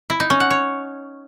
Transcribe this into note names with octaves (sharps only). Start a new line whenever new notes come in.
E4
D#4
C#4
F#5
C#5